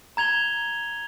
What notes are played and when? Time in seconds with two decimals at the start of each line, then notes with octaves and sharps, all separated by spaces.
0.17 A#5 G#6 F7 G7